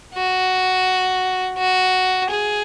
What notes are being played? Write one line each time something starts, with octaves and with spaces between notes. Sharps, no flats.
F#4
F#4
G#4